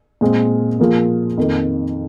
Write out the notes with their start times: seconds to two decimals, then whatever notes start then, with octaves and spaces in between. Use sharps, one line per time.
0.21 A#2 G#3 C4
0.80 A#2 F3 A#3 F4 G#4
1.37 F2 D#3 A#3 D#4